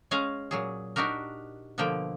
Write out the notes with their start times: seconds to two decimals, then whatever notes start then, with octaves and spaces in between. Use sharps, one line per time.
0.11 G#3 C#4 F5 G#5 A#5
0.51 A#2 F#3 G#4
0.96 D4 D#4 F#4 G4 A#4
1.78 B2 D3 F3 A#3 G5